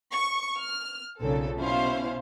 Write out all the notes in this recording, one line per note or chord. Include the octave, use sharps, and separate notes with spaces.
C#6
F6
B1 A#2 C#3 C4 A4
B2 C#4 E4 C5 F5